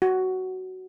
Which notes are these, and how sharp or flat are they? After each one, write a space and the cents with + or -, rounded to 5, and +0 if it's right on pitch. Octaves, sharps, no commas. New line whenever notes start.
F#4 +10